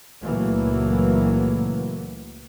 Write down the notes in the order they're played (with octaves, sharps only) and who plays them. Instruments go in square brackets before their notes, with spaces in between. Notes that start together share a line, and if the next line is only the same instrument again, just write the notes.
[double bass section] C#2 A#2 E3 F#3 A3 A#3